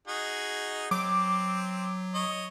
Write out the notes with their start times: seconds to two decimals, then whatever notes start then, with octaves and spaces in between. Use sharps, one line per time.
0.08 D#4 F#4 G#4
0.91 F#3 C4 D6
2.14 C#5 D#5